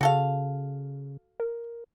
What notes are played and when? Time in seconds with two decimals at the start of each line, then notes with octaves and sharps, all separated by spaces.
0.01 C#3 F#4 A4 F5
1.40 A#4